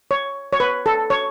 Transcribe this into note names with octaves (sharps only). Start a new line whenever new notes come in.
C#5
C#5
B4
A4
C#5